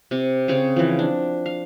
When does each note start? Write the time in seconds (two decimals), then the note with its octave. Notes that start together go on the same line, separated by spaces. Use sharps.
0.11 C3
0.48 C#3 C4 C#5
0.76 E3 F3
0.99 D4
1.46 F5